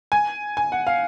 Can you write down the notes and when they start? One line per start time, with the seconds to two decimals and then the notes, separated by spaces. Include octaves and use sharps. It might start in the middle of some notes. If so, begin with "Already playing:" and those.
0.12 G#5
0.57 G#5
0.72 F#5
0.87 F5